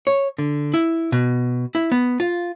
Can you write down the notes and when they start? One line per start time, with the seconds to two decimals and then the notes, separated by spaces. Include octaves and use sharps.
0.07 C#5
0.39 D3
0.74 E4
1.12 B2
1.75 E4
1.92 B3
2.20 F4